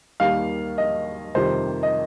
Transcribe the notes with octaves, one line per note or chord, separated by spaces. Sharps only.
D#2 D#3 G3 F5
D#5
F2 C3 D#3 G3 C5
D#5